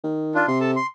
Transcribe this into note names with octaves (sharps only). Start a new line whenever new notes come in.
D#3
D4 F4
C3 C6
A4 A5
C6